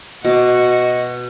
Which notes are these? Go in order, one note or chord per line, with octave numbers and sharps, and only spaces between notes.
B2 F#4 D#5 D6